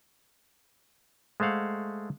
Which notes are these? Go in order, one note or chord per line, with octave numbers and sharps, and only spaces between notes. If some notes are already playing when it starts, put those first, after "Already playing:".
G#3 A3 C5 F5 F#5